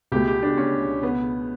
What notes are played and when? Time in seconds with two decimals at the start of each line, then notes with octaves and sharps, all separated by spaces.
0.12 C#2 B2 A3 G4
0.27 G4
0.42 D4
0.57 C#4
1.03 B3